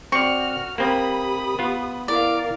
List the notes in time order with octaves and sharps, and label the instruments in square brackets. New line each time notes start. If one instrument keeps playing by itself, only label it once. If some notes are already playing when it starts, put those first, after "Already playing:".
[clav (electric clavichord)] C4 D5 [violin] F#4 F6 [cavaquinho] C#6
[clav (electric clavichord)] A#3 C4 [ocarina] G4 [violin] B5 D#6
[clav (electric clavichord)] B3 F4
[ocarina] E4 [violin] A#4 F5 [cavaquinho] D5